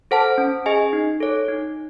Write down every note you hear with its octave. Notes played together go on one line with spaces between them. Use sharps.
A4 C5 F#5 A5
C#4
G#4 D#5 G#5
D#4
A4 C#5
D#4